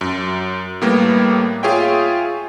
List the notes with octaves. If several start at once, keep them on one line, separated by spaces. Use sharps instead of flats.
F#2
A2 G3 A#3 B3
F4 G#4 C#5 E5 G5